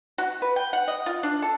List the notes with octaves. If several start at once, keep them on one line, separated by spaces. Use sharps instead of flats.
F#4
B4
G5
F#5
D#5
F4
D4
A4